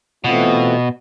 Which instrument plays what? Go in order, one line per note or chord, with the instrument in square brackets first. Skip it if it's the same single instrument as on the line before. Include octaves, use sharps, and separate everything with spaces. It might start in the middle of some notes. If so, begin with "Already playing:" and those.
[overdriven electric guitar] B2 [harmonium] E3 A3 C4 F4